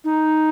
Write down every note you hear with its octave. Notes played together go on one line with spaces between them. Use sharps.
D#4